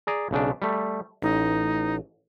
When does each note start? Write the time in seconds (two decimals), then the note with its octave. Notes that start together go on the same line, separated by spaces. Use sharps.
0.07 G#4 D5 A#5
0.31 B1 C#3 D4
0.62 G3 A3
1.22 A1 D#4